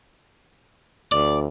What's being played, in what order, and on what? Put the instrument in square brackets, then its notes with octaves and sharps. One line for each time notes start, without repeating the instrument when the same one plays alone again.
[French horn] D2 [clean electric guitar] D5